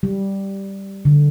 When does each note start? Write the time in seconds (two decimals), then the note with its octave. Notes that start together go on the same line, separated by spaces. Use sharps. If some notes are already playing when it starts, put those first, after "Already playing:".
0.03 G3
1.05 D3